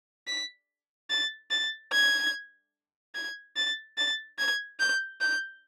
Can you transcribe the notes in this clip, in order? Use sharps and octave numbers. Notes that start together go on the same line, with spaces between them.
B6
A6
A6
G#6
G#6
A6
A6
G#6
G6
G6